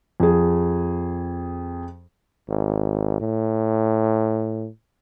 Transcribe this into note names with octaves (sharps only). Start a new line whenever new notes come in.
F2 G#4
G#1
A2